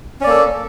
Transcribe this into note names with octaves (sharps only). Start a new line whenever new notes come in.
A#3 C#4 A4 D5